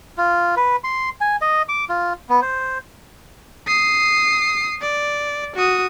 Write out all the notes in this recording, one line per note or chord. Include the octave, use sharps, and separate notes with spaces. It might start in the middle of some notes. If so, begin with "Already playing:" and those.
F4
B4
C6
G#5
D#5
D6
F4
B3
C5
D#6 C7
D5
F#4 D#6